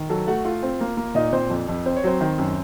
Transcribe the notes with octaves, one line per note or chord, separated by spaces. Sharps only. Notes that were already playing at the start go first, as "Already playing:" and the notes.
Already playing: D#3
F#3 A4 A5
A3 F#4 F#5
A3 F4 F5
C4
A#3
A#3
A#2 D#4 D#5
A#2 C4 C5
F2
F2
C4 C5
C#5
F#3 C4 C5
D#3
F#2